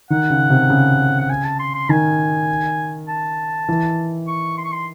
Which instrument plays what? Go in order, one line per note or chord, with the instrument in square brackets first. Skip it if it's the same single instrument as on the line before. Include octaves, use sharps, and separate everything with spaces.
[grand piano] D#3 [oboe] F#5
[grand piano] C#3
C3
C#3
[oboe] F#5
G#5
A5
C6
C6
[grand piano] D#3 [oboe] G#5
[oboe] A5
[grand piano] E3
[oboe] C#6
C6
C#6
C6